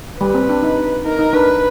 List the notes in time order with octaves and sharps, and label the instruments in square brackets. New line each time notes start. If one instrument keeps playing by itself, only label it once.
[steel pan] G3 [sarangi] B4
[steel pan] C4
D4
D#4
[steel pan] D#4 [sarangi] A#4
[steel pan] D#4
[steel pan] D4 [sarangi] B4